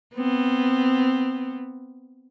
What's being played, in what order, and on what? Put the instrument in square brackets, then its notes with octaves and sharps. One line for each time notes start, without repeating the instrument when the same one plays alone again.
[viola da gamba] B3 C4